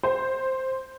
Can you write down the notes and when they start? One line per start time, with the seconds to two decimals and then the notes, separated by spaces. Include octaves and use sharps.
0.03 C5